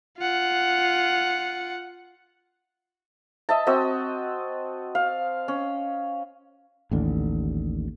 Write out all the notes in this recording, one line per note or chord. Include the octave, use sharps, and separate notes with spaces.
F4 F#5
D#5 E5 A5
C4 F#4 D#5 E6
F5
C#4
A1 D#2 D3